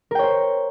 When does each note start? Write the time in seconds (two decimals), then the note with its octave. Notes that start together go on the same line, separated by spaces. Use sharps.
0.11 A#4
0.15 G5
0.19 C#5
0.23 C5